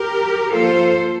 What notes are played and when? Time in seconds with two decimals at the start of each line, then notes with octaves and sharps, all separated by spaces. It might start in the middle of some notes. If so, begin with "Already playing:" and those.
Already playing: G4 A#4
0.52 F3 A#3 F4 A4 C5